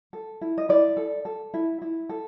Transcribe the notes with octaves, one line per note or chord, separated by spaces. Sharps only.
A4
E4
D#5
E4 D5
A4
A4
E4
E4
A4